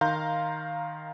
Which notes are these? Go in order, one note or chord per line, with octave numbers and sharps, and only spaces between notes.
D#3 F5 A#5 C6 G6